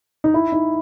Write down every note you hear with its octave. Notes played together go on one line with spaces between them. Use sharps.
D#4
E4
D#4